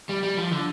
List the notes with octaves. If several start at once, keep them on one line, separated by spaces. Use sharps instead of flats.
G3
G3
F3
D3